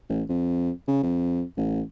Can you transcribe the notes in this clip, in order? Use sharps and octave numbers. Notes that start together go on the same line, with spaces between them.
A1
F2
C#3
F2
A1